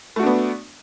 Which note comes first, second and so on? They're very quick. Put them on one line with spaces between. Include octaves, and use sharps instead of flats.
A3 F#4 D4 B3